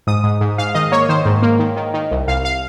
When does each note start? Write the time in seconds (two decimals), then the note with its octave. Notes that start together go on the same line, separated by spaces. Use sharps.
0.07 G#2 D#6
0.24 G#2
0.41 G#2
0.58 G#2 F5
0.75 D#3 D#5
0.92 A#3 C#5
1.09 D#3 C5
1.26 G#2
1.42 A#3
1.59 D#3
1.77 D#3
1.94 D#3
2.11 C2
2.28 C2 F5
2.45 F5